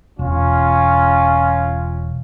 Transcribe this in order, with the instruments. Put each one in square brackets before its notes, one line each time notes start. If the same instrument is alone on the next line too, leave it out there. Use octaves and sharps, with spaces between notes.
[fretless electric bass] E1 [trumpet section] C#4 F4